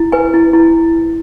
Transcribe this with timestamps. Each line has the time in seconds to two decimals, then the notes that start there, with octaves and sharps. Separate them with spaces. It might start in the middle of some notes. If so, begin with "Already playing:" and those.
Already playing: E4
0.12 B4 G#5
0.34 E4
0.53 E4